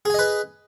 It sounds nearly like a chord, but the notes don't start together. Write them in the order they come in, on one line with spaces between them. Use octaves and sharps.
G#4 G#5 D#5 B4